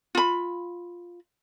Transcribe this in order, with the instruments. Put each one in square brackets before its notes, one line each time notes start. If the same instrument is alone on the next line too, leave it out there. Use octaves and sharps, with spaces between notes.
[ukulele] F4 B5